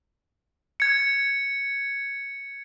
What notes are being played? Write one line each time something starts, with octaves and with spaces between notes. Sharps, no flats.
G#6 C#7